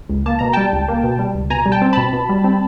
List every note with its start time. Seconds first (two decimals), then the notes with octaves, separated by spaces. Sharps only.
0.09 C#2
0.26 A#3 A5
0.39 B2 A#5
0.53 G3 G5 A5
0.73 C#2
0.88 A#3
1.03 B2
1.19 G3
1.34 C#2
1.50 B2 G#5 A#5
1.66 G3
1.72 G5 A5
1.82 C4
1.93 B2 A5 B5
2.13 B2
2.29 G3
2.44 C4